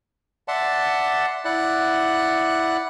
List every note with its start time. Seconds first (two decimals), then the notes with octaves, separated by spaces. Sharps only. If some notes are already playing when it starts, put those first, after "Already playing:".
0.48 D5 E5 F#5 A5 C6
1.45 E4 D5 F#5 F#6